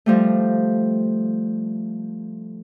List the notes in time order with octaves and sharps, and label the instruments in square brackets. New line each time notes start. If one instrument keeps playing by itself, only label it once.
[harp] F3 G3 A3